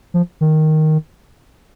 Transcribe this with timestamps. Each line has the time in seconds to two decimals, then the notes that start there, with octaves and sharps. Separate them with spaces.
0.14 F3
0.41 D#3